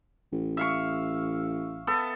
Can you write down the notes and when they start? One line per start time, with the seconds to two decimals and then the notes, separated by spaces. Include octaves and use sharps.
0.32 A1
0.57 E5 F5 C#6
1.87 B3 A4